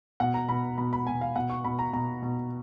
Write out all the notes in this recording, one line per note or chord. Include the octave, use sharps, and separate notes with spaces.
B2 F#5
A#5
B2 B5
B2 B5
B5
B2 G#5
F5
B2 F#5
C#6
B2 B5
A#5
B2 A#5
B2